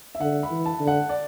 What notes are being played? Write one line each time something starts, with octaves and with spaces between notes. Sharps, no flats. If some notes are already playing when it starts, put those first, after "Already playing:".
E5
D3 F#5
B5
E3
A5
D3
F#5
D5